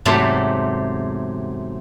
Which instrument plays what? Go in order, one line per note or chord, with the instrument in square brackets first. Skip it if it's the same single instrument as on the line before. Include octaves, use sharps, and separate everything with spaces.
[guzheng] E2 G#2 C3 F#3 A3 C4